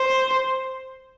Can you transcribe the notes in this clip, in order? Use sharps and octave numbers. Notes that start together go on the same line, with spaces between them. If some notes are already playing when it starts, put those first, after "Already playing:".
Already playing: C5